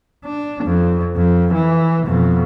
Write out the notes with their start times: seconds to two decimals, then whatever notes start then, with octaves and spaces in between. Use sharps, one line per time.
0.25 D4
0.64 F2
1.16 F2
1.53 E3
2.06 F2 B2